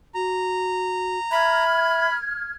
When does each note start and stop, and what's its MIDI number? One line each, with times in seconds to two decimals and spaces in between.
0.15 1.18 66
0.15 1.64 82
1.31 2.08 76
1.31 2.17 83
1.31 2.54 89
1.31 2.54 92